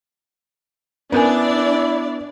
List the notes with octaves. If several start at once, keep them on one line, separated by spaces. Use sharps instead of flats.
B3 C#4 D4 E4 A#4 D5 G#5